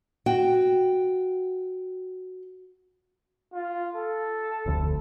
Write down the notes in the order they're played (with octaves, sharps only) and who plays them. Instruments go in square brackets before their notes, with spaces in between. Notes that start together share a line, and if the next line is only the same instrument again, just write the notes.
[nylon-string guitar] F#4 G5
[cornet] F4
A4
[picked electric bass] F1 D2